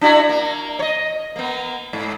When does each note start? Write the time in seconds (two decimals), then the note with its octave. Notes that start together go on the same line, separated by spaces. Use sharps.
0.01 D4 E4 F#4
0.29 A#3
0.79 C#5 D#5
1.36 A#3 B3
1.93 G#2